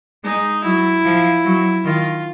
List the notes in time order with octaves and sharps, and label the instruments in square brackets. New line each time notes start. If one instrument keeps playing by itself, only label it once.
[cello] G#3 [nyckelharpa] D#4
[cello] F#3 [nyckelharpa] E4
[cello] F3
F#3
[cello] D#3 [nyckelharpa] F4